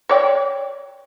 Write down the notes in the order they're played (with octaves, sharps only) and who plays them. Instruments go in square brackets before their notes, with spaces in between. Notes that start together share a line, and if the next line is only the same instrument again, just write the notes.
[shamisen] C#5 D5 G5